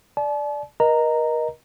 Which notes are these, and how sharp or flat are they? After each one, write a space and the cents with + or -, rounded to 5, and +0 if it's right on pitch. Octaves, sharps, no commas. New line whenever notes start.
D5 +0 A5 -40
A#4 +35 D#5 +0 A#5 -10